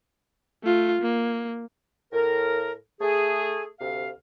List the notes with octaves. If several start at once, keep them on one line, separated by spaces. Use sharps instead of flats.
A3 F4
A#3
A2 A#4
A3 G#4
D2 C3 F5